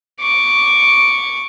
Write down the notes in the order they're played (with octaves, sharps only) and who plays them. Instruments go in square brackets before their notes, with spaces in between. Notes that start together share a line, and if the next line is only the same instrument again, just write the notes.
[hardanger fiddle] C#6 D6